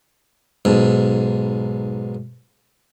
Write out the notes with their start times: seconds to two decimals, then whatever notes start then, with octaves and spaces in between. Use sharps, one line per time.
0.65 B1 G#2